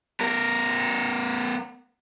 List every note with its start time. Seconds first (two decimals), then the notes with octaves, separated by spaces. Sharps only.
0.21 B3 A#4